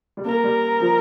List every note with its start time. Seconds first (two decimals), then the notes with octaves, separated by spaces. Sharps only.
0.17 G3
0.25 A#3 A#4
0.44 G3
0.80 F3